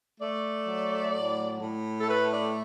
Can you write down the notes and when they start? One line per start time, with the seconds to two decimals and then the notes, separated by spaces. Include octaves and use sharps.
0.19 A3 D5
0.66 F#3
1.13 A2
1.60 A2
2.00 A4
2.07 A3 B4
2.30 D5